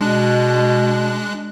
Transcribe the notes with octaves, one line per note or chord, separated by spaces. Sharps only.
B2 G#3 D4 F#6